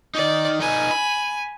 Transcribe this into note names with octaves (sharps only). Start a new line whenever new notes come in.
D#3 D#4 D5
D#4 B4 G#5
B5